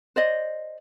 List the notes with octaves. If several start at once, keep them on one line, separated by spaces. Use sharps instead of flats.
C5 D5 D#5